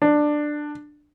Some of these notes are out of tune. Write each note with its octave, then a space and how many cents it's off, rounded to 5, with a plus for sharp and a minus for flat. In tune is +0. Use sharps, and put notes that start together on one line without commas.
D4 +15